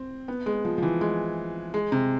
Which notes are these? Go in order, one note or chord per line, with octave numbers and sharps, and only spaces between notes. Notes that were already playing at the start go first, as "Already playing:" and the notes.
Already playing: C4
B3
G#3
F3
F3
E3
G#3
G#3
C3